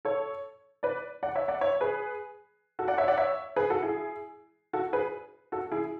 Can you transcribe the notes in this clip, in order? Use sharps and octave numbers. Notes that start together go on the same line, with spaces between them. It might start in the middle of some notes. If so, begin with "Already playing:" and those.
A4 C#5
B4 D5
D5 F#5
C#5 E5
D5 F#5
C#5 E5
G#4 B4
F#4 A4
D5 F#5
C#5 E5
D5 F#5
C#5 E5
G#4 B4
F#4 A4
E4 G#4
F#4 A4
G#4 B4
F#4 A4
E4 G#4